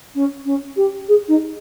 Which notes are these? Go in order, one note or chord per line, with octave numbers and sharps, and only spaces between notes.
C#4
C#4
G4
G#4
D#4